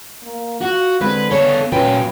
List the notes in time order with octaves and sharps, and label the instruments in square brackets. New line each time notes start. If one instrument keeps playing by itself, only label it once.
[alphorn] A#3
[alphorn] F4 [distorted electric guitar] F#4
[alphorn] D3 [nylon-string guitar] G#3 C4 [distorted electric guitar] B4
[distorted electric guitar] B3 A4 [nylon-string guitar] G#4 C#5
[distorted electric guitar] A#2 G5 [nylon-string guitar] F#3 F4 B4 [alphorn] C#4